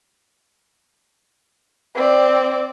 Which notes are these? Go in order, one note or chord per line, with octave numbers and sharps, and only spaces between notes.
C4 D5